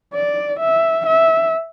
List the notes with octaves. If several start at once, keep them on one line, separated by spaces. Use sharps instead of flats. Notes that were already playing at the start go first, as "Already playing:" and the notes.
D5
E5
E5